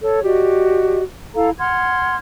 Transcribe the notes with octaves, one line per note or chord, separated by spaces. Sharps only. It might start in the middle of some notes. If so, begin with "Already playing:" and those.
A4 C#5
F#4 G4 D5 D#5
E4 A4 F5 A#5
F#5 C6 F6 G#6